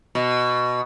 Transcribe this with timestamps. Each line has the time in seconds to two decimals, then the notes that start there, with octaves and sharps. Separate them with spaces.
0.15 B2